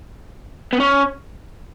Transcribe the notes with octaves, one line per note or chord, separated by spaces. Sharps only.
B3
C#4